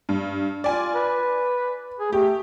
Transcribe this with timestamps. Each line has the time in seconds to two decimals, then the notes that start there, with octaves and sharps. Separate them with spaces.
0.09 G2
0.64 F4 D5 G#5
0.94 B4
1.99 G#4
2.13 A3 G4